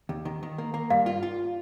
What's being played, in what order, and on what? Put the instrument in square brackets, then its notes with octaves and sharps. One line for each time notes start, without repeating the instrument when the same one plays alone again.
[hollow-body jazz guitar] D#2
D#3
D#3
A#3
A#3
[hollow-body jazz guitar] G2 [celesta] F5
[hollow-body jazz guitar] F4
F4